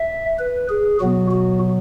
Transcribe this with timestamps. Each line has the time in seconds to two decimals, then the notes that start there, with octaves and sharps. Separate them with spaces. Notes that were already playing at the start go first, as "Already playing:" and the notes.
Already playing: E5
0.39 B4
0.69 G#4
1.00 B2 F#3 B3 F#4
1.31 F#4